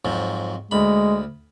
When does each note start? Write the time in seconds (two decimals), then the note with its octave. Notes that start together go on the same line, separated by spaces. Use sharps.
0.05 F2 G#2 F#3
0.71 D2 G#3 B5